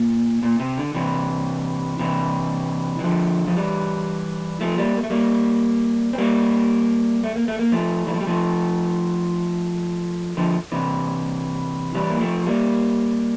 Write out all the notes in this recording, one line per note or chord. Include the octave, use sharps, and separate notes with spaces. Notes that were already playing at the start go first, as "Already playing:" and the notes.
Already playing: A#2
A#2
C3
D3
C3 E3
C3 E3
E3
D3 F3
F3
E3 G3
F3 A3
G3 A#3
A#3
A3
G3 A#3
C4
G3 A#3
A3
A#3
A3
A#3
F3 A3
E3
F3
G3
F3 A3
D3 F3
C3 E3
E3 G3
A#3
F3 A3
G3 A#3